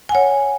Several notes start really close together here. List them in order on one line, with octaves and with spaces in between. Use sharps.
G#5 F#5 C#5